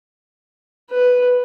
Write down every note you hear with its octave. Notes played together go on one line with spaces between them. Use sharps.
B4